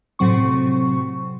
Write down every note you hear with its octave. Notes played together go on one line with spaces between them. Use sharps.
A2 C3 F#3 C4 C#6